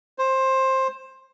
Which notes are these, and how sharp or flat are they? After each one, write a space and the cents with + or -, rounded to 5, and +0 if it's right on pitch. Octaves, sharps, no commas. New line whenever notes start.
C5 +15